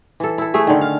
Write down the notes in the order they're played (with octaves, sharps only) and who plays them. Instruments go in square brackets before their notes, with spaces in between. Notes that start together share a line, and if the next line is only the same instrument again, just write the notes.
[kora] E3 A4
E4 A4
A3 G#4 E5
D3 D#3
F5